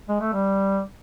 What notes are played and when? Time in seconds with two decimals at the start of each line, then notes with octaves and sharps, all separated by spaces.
0.09 G#3
0.21 A3
0.33 G3